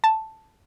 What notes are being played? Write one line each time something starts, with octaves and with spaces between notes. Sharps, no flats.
A5